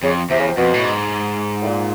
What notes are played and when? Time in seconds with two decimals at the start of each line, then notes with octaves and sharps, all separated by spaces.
0.03 F2 C#3
0.30 E2 C3
0.38 C#3
0.48 C3
0.57 F2 B2
0.74 A2
0.84 G#2
1.62 A2
1.66 A#2